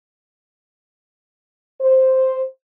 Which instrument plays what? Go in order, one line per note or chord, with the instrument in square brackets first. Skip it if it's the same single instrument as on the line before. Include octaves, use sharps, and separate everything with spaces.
[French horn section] C5